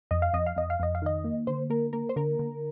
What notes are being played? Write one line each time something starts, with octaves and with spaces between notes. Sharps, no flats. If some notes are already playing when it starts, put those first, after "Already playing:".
F2 D#5
F5
F2 D#5
F5
F2 D#5
F5
F2 D#5
F5
D#3 D#5
A#3
D3 C5
A#3 A#4
A#3 A#4
C5
D3 A#4
D3